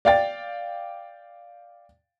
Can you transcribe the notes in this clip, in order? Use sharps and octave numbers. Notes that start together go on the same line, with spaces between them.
D5 F5 G5 A6